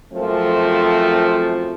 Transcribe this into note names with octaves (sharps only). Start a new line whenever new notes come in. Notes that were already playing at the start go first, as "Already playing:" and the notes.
F#2 F3 A3 C4